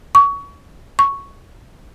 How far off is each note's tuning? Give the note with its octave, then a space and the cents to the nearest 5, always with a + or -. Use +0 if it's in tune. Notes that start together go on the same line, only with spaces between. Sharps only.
C#6 +25
C#6 +0